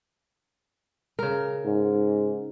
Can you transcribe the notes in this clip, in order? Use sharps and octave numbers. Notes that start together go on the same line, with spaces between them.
C#3 A#4
G#2